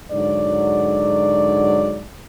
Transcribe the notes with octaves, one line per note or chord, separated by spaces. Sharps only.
G#2 D3 F#3 D5